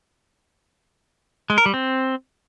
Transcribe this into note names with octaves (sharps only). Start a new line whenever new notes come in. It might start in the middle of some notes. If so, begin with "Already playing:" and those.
G#3
A#4
G3
C4